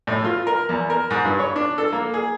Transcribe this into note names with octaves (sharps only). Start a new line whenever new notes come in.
A2
F4
A#4
E2
A#4
G#2
G2
C#5
D4
A4
A#3
G#4